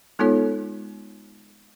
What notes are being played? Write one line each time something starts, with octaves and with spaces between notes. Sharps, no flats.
G#3 B3 D#4 F4 A4 C#5